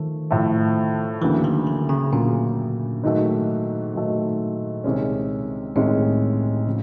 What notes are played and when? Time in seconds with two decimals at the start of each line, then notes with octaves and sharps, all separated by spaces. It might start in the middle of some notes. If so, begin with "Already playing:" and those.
Already playing: D#3 F3 A3
0.31 A2 F3 A3
1.22 D2 C#3 E3 F#3 A#3
1.45 D#3
1.67 D3
1.89 C#3
2.12 D2 A#2 C#3 F#3 A#3
3.03 G#2 D#3 F#3 A3
3.94 G#2 D#3 F#3 A3
4.84 C2 C3 D#3 G#3 C#4
5.76 C2 A2 C3 D#3 G#3 C#4
6.66 C#3 F3